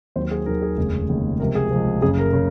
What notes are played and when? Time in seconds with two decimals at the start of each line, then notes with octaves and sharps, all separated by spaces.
0.16 D#2 D#3 F#3 C5
0.31 G#4
0.46 D#2 D#3 F#3 A#4
0.62 G#4
0.77 F1 D#2 C#3 G#3
1.09 F1 D#2 C#3 G#3
1.40 C#2 C3 F3 A#4
1.55 G#4
1.71 C#2 C3 F3
2.02 F#1 F#2 C#3 G#4
2.18 A#4
2.33 C#3